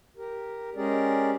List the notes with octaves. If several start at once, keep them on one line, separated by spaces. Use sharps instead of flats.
G4 A#4
G#3 C#4 G4 G#4 A#4 D5